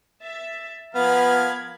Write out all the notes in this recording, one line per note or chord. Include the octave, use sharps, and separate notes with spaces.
E5 A6
F3 B3 A#4 F5 B5 G#6